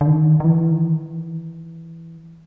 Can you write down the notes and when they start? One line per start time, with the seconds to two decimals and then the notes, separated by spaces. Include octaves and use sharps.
0.01 D3
0.07 D#3
0.40 D#3
0.44 E3
0.71 D#3
0.82 E3